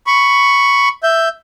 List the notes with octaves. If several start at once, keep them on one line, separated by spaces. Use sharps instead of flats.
B5 C#6
E5 G6